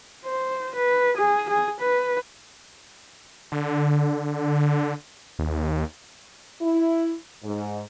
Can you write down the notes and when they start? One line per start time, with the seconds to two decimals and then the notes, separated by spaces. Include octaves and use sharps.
0.25 C5
0.75 B4
1.17 G#4
1.50 G#4
1.80 B4
3.52 D3
5.39 D#2
6.61 E4
7.43 G#2